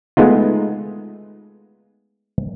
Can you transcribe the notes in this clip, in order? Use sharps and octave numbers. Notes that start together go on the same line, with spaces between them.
G#3 A3 B3 D#4 F4